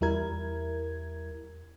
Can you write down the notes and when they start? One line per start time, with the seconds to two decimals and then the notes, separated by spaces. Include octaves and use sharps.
0.01 E2 G3 E4 A#4 G#6